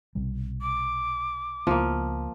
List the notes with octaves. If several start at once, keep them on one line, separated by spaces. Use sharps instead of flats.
B1 C3 G3
D6
C#2 C#3 F3 A#3 B3